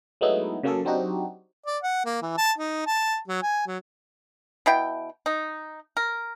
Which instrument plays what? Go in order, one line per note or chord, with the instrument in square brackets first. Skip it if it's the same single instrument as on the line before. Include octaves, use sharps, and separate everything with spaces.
[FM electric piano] F#3 G#3 A3 B3 D#4 E4
C#3 F#3 A#3 C#4 G#4 A4
F#3 C4 D4 D#4 F#4 G4
[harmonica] D5
F#5
A#3
E3
A5
D#4
A5
F#3
G#5
F#3
[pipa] B2 E4 G5
D#4
A#4